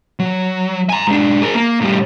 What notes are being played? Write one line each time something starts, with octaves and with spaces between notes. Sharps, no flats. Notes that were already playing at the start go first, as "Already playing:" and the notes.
F#3
G#5 A#5
G#2 D4
G#4 A#4
A#3
A2 G3